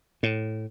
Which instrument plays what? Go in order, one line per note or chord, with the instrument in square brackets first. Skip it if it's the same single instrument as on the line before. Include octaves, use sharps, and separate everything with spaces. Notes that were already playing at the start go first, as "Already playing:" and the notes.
[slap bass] A2